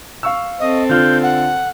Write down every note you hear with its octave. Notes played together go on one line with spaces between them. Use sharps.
F5 C#6 E6
C4 A4 D#5
D3 F4 F6 G6
F#5